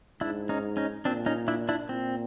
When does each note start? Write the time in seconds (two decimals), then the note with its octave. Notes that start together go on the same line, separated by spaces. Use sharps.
0.21 G#2 D4 E4
0.49 C#4 D#4
0.77 C#4 D#4
1.05 A#2 C4 D4
1.26 C#4 D#4
1.48 D4 E4
1.69 D4 E4
1.89 A#2 C4